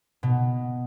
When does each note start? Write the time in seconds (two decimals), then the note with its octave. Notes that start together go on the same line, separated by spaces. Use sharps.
0.23 B2